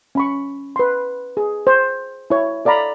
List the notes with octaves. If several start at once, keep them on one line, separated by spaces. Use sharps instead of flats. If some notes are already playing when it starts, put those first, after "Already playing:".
C#4 B5 C#6
B4 C6
G#4
C5
E4 C#5
A4 D5 F5 A#5 B5